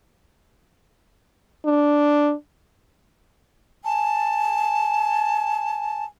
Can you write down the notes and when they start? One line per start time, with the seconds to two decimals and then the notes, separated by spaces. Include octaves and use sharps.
1.65 D4
3.85 G#5 A5